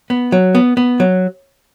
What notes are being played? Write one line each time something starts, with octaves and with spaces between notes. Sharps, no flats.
B3
F#3
B3
B3
F#3